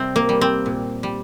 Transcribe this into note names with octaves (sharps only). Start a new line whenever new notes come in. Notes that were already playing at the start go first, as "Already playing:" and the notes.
Already playing: C3 G3 C4
A#3
G3
C4
A#2
G3